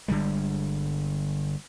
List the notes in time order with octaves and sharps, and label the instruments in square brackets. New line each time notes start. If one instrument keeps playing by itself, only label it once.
[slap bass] G1 D3 G3 G#3